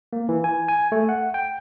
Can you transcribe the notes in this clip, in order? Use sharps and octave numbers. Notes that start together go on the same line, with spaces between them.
A#3
E3
G#5
G#5
A3
F#5
G5